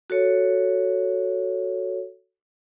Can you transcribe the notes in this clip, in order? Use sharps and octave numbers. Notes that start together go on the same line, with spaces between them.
F#4 A4 C#5